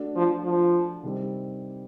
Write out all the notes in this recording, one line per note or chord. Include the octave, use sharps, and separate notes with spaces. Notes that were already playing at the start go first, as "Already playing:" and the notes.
Already playing: A3 D4 F#4 A4
F3
F3
C3 D#3 G3 C4